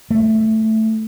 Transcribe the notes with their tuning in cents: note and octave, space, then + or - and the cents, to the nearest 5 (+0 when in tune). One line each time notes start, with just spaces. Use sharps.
A3 +0